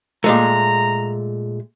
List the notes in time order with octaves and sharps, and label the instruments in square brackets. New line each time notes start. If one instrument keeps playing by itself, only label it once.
[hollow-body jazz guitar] A#2 G#3 A3 [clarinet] A#5